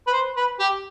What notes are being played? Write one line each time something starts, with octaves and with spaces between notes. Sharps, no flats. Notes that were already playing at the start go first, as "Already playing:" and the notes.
B4
C5
B4
G4